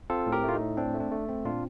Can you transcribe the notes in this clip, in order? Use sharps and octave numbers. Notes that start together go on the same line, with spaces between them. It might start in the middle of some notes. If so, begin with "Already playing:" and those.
C4 F4 A4
A2
G4 A#4
A3 F4
D#4
A2
C4 D4
A3
D4
A3
C4
A#2 D4 F4